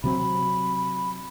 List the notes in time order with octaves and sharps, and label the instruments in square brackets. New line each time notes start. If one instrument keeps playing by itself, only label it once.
[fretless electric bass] C3 F#3 C4 [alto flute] B5